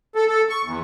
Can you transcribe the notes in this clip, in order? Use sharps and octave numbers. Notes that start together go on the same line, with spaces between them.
A4
A4
C#6
E2